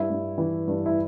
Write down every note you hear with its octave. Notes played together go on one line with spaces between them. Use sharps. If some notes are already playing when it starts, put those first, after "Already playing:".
Already playing: G2 E4
G2
E3
G2
E4